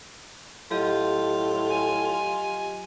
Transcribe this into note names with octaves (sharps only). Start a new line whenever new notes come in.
A2 F#3 F4 G4 D#5
G#5